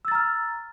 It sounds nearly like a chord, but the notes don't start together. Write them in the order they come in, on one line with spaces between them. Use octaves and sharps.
E6 A6 A#5 F6